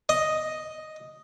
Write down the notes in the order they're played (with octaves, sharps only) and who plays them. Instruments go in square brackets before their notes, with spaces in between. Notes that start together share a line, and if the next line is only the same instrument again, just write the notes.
[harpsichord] D#5